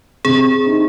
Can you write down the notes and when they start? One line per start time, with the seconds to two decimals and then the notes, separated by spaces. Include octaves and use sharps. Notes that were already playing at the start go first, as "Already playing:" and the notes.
0.25 C3 G#4
0.66 D#4